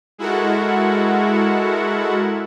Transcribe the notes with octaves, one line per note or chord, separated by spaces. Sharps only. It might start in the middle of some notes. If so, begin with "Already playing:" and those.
G#3 E4 F#4 A4 A#4 F#5